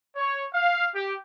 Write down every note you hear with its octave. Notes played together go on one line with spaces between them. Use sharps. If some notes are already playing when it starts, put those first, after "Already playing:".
C#5
F5
G4